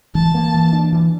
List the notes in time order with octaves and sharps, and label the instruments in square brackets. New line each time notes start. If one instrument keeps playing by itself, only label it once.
[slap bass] E3 [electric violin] A5
[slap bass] A#3
E3
D4
E3